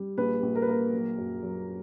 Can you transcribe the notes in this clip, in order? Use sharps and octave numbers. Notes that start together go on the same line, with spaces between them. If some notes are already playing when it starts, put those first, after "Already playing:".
Already playing: G3
A#1 B4
A#1
A#4
B4
A#3 A#4
F#3
F#2
F#3